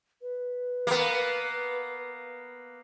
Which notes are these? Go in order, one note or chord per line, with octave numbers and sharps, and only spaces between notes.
B4
A#3 B3